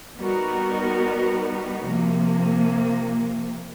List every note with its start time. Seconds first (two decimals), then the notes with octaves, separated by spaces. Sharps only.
0.17 G3 B3 D#4 F#4 A#4
1.83 C3 F3 A#3